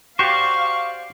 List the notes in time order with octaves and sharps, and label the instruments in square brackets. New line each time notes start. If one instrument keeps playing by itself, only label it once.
[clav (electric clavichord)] F#4 G4 [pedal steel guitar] C5 D5 [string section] F5 [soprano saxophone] C#6